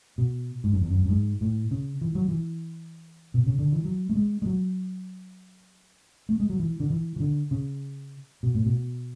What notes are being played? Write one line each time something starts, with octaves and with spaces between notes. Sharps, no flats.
B2
G#2
F#2
E2
F#2
F#2
G#2
A2
C#3
E3
F#3
E3
B2
C#3
D3
E3
F#3
A3
G#3
G#3
F#3
A3
G#3
F#3
E3
D3
E3
E3
D3
C#3
B2
A2
B2